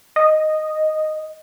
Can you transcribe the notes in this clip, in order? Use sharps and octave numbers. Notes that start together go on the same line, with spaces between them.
D#5